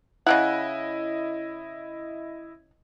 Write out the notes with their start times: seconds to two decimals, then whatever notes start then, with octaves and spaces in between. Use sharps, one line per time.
0.27 C#3 C4 E4 D#5 F#5